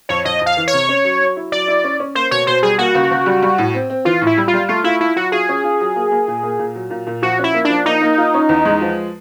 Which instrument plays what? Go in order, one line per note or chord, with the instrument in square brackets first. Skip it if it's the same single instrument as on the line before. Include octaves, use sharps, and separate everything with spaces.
[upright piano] F2 [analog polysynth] C#5
[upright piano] F2 [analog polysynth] D#5
[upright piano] F2
[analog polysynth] F5
[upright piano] E3
[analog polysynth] C#5
[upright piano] C3
C#4
F#3
F#3
E4
[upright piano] F#3 [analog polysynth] D5
[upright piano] E4
C#4
C#4
[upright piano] A#3 [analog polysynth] C5
[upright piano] B2 [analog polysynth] C#5
[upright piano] B2 [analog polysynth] C5
[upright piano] G3 [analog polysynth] G#4
[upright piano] A#3 [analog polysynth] F#4
[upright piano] C#2
C#2
G3
G3
A2
C4
C4
[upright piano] E3 [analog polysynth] F4
[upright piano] A2
[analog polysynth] E4
[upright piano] G3
[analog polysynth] F4
[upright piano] G3
[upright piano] A3 [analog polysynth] F4
[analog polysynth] E4 [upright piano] F4
[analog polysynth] E4 [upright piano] F4
[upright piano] F#3 [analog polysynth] F#4
[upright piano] F4 [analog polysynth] G#4
[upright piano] C#4
F4
F#3
A#3
A#3
A#2
A#3
A#2
F#3
A#2
A#2
[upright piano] F3 [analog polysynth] F#4
[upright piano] C#4
[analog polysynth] E4
[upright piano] A#3
[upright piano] F3 [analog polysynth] D4
[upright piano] A#3 [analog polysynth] D#4
[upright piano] A#3
F4
C#4
E2
G#3
F3